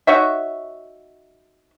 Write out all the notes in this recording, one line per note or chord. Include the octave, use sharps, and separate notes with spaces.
D#4 F#4 C#5 E5